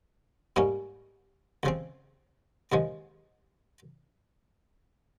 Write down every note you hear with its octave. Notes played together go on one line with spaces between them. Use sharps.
G#2 G3 A#3 C#4
C#2 C#3 F3 C4
D#2 C#3 F3 G#3